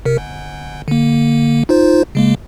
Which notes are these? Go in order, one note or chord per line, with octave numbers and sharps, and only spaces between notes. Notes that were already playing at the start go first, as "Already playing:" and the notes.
C3 A#4
G1
D3 A#3
D#4 F4 C5
C#3 G#3 A#3